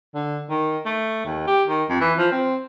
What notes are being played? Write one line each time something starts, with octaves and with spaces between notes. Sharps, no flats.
D3
D#3
A3
D#2
G4
D#3
F2
E3
F3
C4